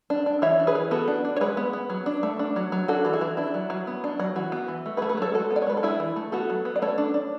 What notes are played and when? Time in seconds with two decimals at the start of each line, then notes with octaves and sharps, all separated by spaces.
0.10 D4
0.26 D4
0.42 E3 C#5 E5
0.59 D4
0.67 G#4 B4
0.75 E3
0.91 B3 F#4 A4
1.08 D4
1.25 D4
1.36 C#5
1.41 G#3 G#4 B4
1.57 B3
1.73 B3
1.90 F#3
2.06 D4
2.23 A3
2.39 D4
2.56 F#3
2.72 F#3
2.88 D4 F#4 A4
3.05 E3 A4
3.13 E4 G#4
3.21 E3
3.37 D4 E4
3.54 F#3
3.70 F#3
3.87 B3
4.04 D4
4.19 F#3
4.36 E3 F#4
4.52 B3
4.68 E3
4.86 A3
4.97 G#4 B4
5.02 A3
5.09 G#4 B4
5.17 F#3 A4 C#5
5.34 G#3 F#4 A4
5.50 B3
5.56 D5
5.62 C#5
5.67 G#3 B4
5.77 A4
5.83 D4 E4 G#4
6.00 E3
6.16 A3
6.32 B3 F#4 A4
6.50 F#3
6.65 B3
6.76 D5
6.82 A3 A4 C#5
6.98 D4
7.14 D4